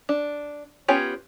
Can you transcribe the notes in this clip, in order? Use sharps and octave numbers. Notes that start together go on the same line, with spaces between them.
D4
B3 C#4 F4 G4 C#5